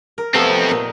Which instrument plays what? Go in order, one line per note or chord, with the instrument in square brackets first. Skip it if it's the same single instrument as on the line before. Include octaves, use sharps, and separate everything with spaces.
[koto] A#4
[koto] C3 A3 B3 [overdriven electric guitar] C4 A4
[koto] A#2 D#4